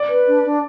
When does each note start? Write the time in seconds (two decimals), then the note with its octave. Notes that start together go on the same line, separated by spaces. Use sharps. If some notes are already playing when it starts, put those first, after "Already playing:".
Already playing: D5
0.09 B4
0.27 D4
0.45 D4